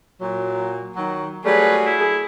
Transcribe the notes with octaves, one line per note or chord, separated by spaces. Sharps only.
A#2 F#3
D#3 F#3
F#3 G3 A3 G#4 B4
E4